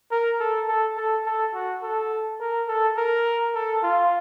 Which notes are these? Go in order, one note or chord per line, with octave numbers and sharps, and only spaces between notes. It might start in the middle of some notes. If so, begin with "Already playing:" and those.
A#4
A4
A4
A4
A4
F#4
A4
A#4
A4
A#4
A4
F4